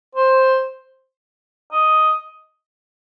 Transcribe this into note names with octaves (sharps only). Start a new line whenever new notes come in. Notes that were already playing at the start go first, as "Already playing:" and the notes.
C5
D#5